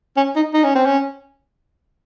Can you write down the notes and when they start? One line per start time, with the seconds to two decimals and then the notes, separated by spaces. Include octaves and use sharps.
0.17 C#4
0.36 D#4
0.54 D#4
0.64 C#4
0.75 C4
0.86 C#4